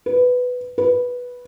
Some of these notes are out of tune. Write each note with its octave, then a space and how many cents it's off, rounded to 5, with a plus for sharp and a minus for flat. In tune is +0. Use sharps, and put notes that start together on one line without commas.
B4 +10
B4 -5